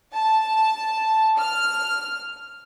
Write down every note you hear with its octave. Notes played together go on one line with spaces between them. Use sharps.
A5
F6